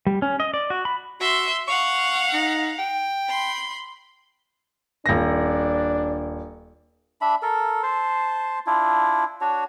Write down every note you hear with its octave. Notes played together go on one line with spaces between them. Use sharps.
G3
C#4
D#5
D5
F#4
B5
F#4 E5 C6
F5 F#5 C#6
D#4
G5
B5 C6
D#1 D4 A#6
D4 E5 B5
A4 A#4
C5 A5 C6
D4 E4 F4
D4 F#4 C#5